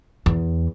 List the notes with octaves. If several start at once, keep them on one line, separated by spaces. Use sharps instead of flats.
E2